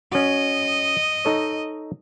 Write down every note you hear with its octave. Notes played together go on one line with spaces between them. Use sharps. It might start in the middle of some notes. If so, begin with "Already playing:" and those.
C#4 F#4 D#5
D#4 A4 C#5